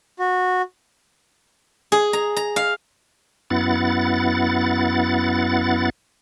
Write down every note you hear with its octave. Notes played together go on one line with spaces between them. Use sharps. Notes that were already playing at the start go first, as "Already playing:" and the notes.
F#4
G#4
A#5
A#5
F5
F#2 B3 E4 F#5 A6